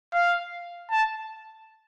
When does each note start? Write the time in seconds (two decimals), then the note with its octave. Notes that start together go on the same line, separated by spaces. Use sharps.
0.14 F5
0.91 A5